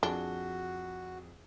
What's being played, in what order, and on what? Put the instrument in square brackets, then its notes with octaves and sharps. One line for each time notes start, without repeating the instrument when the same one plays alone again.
[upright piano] F2 G#4 G7 [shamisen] D4 [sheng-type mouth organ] F#4